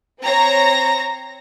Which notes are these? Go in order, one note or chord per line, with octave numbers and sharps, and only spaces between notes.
C4 C5 C#5 A#5 A#6